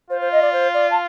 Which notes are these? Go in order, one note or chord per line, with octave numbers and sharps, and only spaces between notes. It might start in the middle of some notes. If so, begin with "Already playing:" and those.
F4 C5
C5
D#5
D5
C5
D5
A5